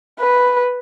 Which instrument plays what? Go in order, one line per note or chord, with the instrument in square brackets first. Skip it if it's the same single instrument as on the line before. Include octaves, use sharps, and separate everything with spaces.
[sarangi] B4